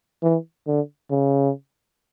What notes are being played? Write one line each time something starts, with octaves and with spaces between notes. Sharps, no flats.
E3
D3
C#3